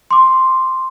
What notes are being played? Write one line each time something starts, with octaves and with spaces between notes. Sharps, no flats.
C6 D6